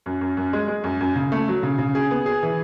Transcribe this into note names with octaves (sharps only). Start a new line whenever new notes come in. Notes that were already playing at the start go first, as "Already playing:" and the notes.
F#2
F#2
F#2
G#3
G#3
F#2
F#2
C#3
A3
F#3
C#3
C#3
G#4
B3
G#4
E3